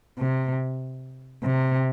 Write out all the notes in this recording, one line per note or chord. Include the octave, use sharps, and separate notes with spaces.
C3
C3